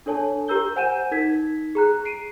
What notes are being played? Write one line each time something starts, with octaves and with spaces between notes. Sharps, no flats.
D4 A4 C#5 G#5 A5
G4 A#4 A#5 E6 G6 G7
C5 F#5 G#5 G6 D#7 E7
D#4 A#4 G#6 B6
G#4 A#5 F#6
C7 D7 D#7